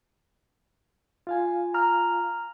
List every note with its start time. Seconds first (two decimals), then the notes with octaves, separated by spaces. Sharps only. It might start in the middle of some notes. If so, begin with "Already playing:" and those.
1.27 F4 F5 G#5
1.74 A#5 F6